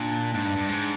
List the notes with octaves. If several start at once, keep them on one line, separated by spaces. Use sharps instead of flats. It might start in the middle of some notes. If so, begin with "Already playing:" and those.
Already playing: A#2 D4
G#2 D4
G2
G2
G#2